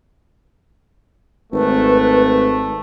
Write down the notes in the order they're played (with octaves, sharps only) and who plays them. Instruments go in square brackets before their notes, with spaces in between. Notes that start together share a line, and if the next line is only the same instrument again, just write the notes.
[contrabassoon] G#1 [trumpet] A3 [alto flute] B4